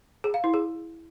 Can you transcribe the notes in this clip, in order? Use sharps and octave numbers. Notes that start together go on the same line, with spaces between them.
G#4
F5
E4
G#4